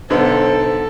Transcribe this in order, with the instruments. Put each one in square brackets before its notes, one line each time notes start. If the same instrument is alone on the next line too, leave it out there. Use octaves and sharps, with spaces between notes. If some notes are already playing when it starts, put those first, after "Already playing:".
[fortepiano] B1 D3 B3 [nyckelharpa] A4 [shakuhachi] C5